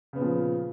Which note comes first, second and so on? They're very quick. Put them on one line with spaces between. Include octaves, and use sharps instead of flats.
C#3 B3 A#2 F3